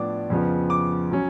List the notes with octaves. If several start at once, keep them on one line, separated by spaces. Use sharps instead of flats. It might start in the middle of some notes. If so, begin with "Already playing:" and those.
Already playing: A2 F3 B3 D4 D6
F2 C#3 F3 B3
D6
F#3 C#4